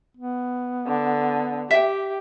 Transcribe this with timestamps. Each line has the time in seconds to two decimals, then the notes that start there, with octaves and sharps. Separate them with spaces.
0.17 B3
0.87 D3
1.71 G4 E5 G5